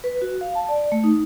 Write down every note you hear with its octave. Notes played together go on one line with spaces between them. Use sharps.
B4
F#4
F5
A5
D5
A3
D#4